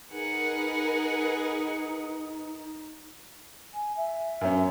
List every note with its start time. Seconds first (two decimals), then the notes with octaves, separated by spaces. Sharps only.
0.12 D#4 G#4 A#4 B4 F#5
3.74 G#5
3.97 E5
4.41 F#2 C#4